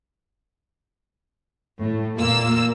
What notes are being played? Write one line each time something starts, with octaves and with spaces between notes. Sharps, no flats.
A2
E2 A#2 A#3 F4 E6